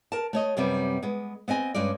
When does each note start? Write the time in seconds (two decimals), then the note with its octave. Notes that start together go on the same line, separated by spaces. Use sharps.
0.12 A#4 A5
0.33 A3 C#5 D#5
0.57 F#2 C3 G3 B3 C4
1.03 G#3 B3
1.48 B3 C4 D#5 G#5
1.74 G2 G#3 C#4 D5